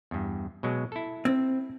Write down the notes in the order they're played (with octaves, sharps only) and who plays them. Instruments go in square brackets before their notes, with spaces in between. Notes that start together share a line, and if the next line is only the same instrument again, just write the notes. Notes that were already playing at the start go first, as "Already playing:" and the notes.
[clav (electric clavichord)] E2 G2
B2 F#3 G#3
E4 A4
[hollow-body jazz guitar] C4